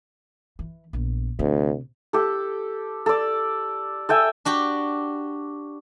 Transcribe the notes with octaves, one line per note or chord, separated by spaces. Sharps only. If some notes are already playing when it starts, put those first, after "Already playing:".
E3
A#1 B3
D2 C3
G4 A4
A4 D5
A4 E5 G5 G#5
D4 F#4 G4